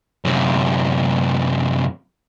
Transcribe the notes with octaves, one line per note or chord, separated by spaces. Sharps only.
F#2 C3